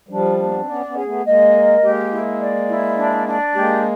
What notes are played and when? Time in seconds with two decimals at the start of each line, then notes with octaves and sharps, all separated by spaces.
0.09 F3 G3 D4
0.37 D4
0.43 A#3
0.51 B3
0.59 C4
0.66 B3 C#4 D5
0.86 B3 C#4
0.95 G#4
1.04 A3 B3
1.24 G#3 A#3 D#5
1.53 A#4
1.81 G#3 A#3 G4
2.10 E4
2.40 D5
2.68 E4
2.97 D4
3.26 D4
3.55 G#3 A#3 G4